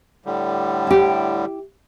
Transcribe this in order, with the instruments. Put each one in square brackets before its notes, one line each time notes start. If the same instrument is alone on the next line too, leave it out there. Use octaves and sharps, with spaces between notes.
[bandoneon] A2 D3 G3
[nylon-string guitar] E4 G4